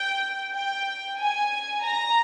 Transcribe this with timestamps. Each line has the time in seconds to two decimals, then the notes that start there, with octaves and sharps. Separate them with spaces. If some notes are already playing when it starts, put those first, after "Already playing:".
Already playing: G5
0.53 G5
1.19 G#5
1.85 A#5